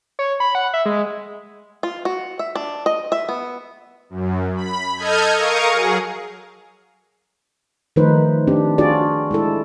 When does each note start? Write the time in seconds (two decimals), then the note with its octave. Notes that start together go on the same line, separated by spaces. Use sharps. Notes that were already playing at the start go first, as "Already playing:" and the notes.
0.19 C#5
0.40 B5
0.55 F#5
0.74 E5
0.86 G#3
1.83 F4
2.05 F#4
2.39 E5
2.55 D4
2.86 D#5
3.12 E5
3.29 B3
4.10 F#2
4.56 B5
4.97 A4 D#5 D#6 F6 G6 G#6
5.34 A#4 F5 C#6 D#6
5.69 F#3 G#4
7.96 D#3 F3 A3 D#4 B4 C5
8.47 C4 D4 G4
8.78 D4 F4 F#4 G#4 D5
9.31 G#3 E4 A4